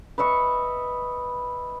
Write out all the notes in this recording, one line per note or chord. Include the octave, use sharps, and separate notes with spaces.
B4 D#5 E5 C#6